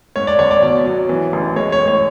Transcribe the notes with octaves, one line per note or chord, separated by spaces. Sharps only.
G#2 C#5
D5
G#1 C#5
D5
B2 D5
F#3
E3
A1
G#3 C#5
C#5
A2
C#5